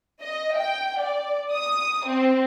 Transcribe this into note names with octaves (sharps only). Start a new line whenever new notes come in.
D#5
G5
D5
D#6
C4